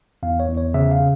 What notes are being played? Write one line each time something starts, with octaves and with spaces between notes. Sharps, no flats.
E2 F5
C#5
E2
C#5
C#3 E5
F5
C#3